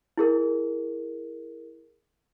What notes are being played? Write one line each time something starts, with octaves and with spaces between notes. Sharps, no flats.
E4 G#4 A#4